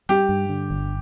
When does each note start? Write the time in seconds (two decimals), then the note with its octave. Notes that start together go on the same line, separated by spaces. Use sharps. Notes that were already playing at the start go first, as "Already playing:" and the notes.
0.09 G3 G4
0.29 G2
0.49 D3
0.70 G1